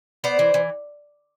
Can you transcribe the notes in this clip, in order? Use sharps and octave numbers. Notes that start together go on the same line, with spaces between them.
B3 C5 D5
E3
E3